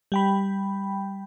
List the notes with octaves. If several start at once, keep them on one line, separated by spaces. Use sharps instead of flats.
G3 G5 B5